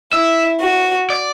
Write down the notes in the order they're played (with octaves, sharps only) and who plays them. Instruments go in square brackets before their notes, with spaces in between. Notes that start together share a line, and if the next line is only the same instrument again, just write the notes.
[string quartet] E4 [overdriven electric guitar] E5
[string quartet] F#4
[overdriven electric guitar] D5